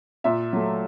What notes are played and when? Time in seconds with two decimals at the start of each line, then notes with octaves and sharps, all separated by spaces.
0.24 A#2 E5
0.53 F#3 A3